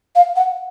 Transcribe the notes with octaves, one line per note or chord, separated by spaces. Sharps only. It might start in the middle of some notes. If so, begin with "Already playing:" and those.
F5
F#5